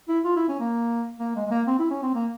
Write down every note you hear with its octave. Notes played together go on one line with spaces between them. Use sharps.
E4
F4
E4
C#4
A#3
A#3
G#3
G#3
A#3
C4
E4
C#4
C4
A#3